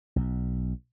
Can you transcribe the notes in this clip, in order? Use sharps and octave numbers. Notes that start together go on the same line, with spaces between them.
B1